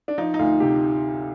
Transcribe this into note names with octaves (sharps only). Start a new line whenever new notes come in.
D4
F3 D#4
D#4
D2 F4
C3 G4